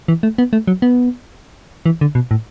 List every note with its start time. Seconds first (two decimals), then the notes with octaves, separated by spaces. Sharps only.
0.08 E3
0.23 A3
0.38 B3
0.53 A3
0.67 F#3
0.82 B3
1.86 E3
2.01 D3
2.15 B2
2.31 A2